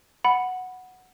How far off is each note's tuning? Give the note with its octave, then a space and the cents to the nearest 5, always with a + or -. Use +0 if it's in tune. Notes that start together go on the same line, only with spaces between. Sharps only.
F#5 +0 B5 +0